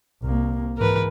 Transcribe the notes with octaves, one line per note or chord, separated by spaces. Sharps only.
C2 A#3
G#2 E3 A#4 B4